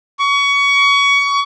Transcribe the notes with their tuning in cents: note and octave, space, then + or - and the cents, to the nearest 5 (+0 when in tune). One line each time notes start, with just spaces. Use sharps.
C#6 +25